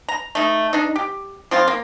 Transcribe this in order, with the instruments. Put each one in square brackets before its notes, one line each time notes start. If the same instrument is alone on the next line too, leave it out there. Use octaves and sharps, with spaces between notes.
[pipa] A#5
A3 D#4
D4 D#4
G4
F3 C4 F4
A#3